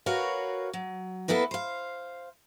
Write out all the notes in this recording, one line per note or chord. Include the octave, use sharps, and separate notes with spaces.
F#4 A#4 B4 C#5 F5
F#3
A#3 B3 E4 A4 B4
C5 F5